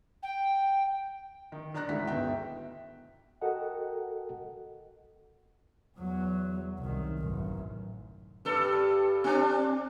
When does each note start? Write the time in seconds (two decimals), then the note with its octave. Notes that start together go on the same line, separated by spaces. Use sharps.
0.22 G5
1.52 D#3
1.74 D#3 D4 D5 A#5 F#6 A#6
1.89 D2 G#2 E4 B6
2.07 G1 B2 E5 G5
3.41 F#4 A4 A#4 D#5 F#5 G5
5.99 E2 F#3
6.80 C2 D#3
7.19 A1 F#2
8.45 G2 A4
9.24 C4 D4